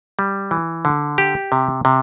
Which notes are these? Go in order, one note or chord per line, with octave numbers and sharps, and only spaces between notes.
G3
E3
D3
G4
C3
C3